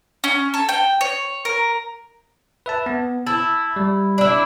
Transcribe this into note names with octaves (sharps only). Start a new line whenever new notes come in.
C#4
A4
G5
C#5
A#4
B4 E5 A5
B3
E4 A5 E6
G3
D4 E4